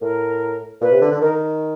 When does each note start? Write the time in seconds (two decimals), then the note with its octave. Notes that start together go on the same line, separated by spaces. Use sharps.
0.01 A2 A#4
0.81 A#2 B4
0.92 C3
1.01 D3
1.12 D3
1.21 D#3 A#4